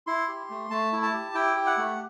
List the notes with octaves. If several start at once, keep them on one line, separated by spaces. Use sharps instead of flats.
E4 C6
G4
A3
A3 A5
E4
A5
G4
E4 G5
G4
F#5
A3